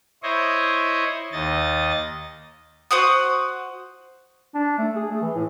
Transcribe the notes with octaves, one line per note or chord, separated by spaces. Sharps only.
E4 C5 C#5 D#5
D#2 D#5 A6
F#4 C5 F#5 D#6
D4
A3
G#4
A3
E3
A2